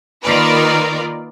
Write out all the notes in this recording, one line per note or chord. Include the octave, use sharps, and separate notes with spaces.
D#3 A#3 F4 A#4 B4 D5